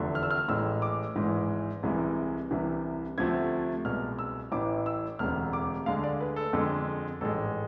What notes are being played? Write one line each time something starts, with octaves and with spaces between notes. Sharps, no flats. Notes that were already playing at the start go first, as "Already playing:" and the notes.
Already playing: F1 E2 D3 F3 A3
F6
E6
F6
A1 A2 G#3 E6
D6
G#1 G#2 E3 G#3
C2 C3 E3 G#3
C2 C3 E3
D2 C3 F3 A3 G#6
C2 B2 G#3 F6
E6
A1 A2 E3 D6
E6
E1 D2 C3 F6
D6
D2 D3 G#3 F5
D5
B4
A4
F2 D3 G#3
A1 G#2 G#3 A4